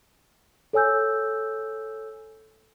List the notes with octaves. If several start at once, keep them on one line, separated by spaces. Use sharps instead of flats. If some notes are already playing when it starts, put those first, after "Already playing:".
A4 C#5 G#5 E6 G6